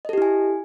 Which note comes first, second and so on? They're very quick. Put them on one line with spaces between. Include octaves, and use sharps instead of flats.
D#5 A4 G4 E4 G#5